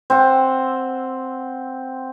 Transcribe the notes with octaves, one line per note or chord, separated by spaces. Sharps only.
C4 F#5